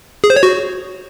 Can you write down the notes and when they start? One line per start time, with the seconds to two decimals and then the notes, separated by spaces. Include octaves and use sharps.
0.24 G#4
0.30 C5
0.36 C#5
0.43 F#4